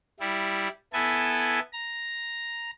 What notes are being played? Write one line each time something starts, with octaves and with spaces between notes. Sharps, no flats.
G3 E4
B3 E4 A4 G#5
A#5